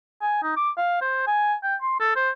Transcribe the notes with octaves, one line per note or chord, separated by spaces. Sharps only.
G#5
D#4
D6
F5
C5
G#5
G5
C6
A4
C5